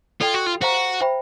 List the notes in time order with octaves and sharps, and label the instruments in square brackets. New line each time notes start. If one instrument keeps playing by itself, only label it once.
[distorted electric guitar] F4 [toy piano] A4 D5 G5 C6
[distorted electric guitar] F#4
F4
[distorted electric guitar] F#4 [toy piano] G4 C5 F5 A#5
[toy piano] C5 E5 G5 B5